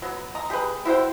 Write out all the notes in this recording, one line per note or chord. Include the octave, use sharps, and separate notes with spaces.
F#3 B3
D#5 A#5
G4 G#4 B4
E4 F#4 C5 G5